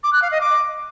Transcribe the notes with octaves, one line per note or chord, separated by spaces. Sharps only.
D6
F#6
F5
D#5
D6